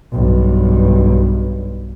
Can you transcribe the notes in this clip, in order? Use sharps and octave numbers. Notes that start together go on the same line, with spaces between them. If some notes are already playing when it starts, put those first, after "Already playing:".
B1 G2